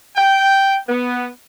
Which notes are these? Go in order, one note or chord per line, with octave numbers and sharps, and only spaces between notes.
G5
B3